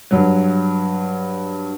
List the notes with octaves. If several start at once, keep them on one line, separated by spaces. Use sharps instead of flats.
G2 F#3